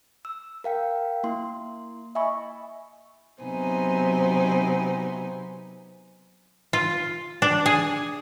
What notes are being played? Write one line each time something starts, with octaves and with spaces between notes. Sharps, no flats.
E6
A#4 F5 G5
A#3 E4 C6
D#5 E5 G#5 B5 C#6
C3 F#3 B3 D#4 C5 G#5
F4
D4
G#4